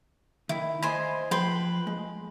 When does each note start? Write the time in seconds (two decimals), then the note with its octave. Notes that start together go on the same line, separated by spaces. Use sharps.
0.49 D#3 E4
0.83 C5 D#5 G#5 B5
1.31 F3 B4 G5 C6
1.87 G#3